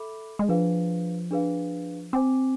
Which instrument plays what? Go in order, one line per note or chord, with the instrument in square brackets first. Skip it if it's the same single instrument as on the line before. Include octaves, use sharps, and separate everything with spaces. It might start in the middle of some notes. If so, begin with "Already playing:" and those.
Already playing: [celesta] A4 E5 B5 D6
[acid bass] G#3
[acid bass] F3 [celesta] D4 G#4 B4 F5
[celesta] D4 G#4 B4 F5
[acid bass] C4 [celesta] C5 G#5 D6